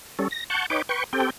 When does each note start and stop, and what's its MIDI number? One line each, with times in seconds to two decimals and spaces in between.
0.19 0.28 55
0.19 0.28 61
0.19 0.28 69
0.31 0.44 94
0.50 0.66 78
0.50 0.66 81
0.50 0.66 85
0.50 0.66 91
0.70 0.82 63
0.70 0.82 71
0.70 0.82 73
0.70 0.82 79
0.70 0.82 86
0.89 1.04 71
0.89 1.04 79
0.89 1.04 85
1.13 1.30 60
1.13 1.30 67
1.13 1.30 69
1.13 1.30 79